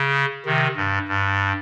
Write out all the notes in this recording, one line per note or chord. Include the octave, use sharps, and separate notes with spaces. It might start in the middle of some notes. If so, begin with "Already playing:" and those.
Already playing: C#3
C3 D#3
G2
G2